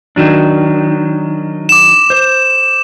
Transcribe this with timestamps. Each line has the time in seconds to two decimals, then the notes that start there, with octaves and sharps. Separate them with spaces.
0.16 D#3 F#3 D4
1.69 D6 E7
2.10 C5